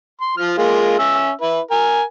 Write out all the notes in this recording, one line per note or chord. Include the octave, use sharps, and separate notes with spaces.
C6
F3 F6
G#3 A#3 F4
C#4 E5 E6
E4 B4
A#4 G#5